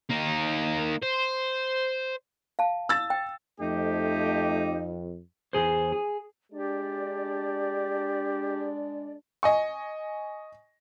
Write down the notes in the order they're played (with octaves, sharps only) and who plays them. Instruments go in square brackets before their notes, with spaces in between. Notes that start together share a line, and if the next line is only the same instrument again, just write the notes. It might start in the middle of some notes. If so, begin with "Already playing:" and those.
[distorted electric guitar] A#3 D#4
C5
[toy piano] F5 A5
[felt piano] E6 A6
[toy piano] G5
[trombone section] F2 [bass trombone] A3 [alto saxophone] D#4 [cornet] G4
[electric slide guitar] E2 A#2 G#4 C5
G#4
[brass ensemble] G#3 D4 [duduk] G4 [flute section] D5
[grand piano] D#5 G#5 C#6